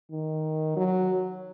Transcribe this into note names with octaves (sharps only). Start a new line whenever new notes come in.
D#3
F#3